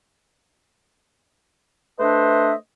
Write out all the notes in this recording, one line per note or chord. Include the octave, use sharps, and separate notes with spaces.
A3 D4 B4 C5 D#5 E5